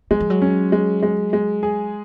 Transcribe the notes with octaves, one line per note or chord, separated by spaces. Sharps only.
F#3 G#3
F3
F#3
C#4
G#3
G#3
G#3
G#4